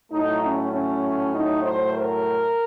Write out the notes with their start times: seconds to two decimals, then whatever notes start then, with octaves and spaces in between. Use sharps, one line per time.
0.11 A2 F#3 A3 D#4
0.42 C#4
0.72 C#4
1.34 D#4
1.63 C5
1.93 A#4